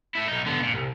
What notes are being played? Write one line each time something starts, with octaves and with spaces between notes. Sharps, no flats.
A3 E4
B1 D#4
D3 B3
A#2 C#3
C2